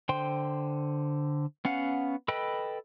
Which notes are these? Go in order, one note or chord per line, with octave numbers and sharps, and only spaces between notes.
D3 C5 G5 C6
B3 C#4 F5 F#5
A4 B4 D#5 G5 B5